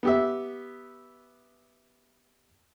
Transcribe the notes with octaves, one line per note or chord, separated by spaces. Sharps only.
B3 G4 E5